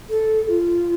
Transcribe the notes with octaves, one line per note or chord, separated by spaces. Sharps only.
A4
F4